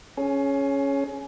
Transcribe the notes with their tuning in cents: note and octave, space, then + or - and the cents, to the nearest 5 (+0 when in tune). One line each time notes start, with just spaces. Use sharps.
C#4 +0 G#4 +25